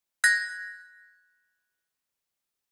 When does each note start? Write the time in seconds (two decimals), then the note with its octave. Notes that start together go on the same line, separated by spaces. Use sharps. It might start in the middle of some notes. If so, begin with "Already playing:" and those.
0.24 F#6 G#6 A#6